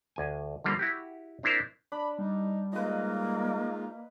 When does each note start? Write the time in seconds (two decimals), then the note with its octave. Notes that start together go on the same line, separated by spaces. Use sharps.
0.16 D2 G#5
0.64 D3 F3 G3 A#3 C4
0.79 E4 F#4 G4
1.43 C4 D4 E4 A#4 C5
1.92 D4 B5
2.19 G3 D#4
2.73 G#3 A#3 D#4 F4 B4 D#5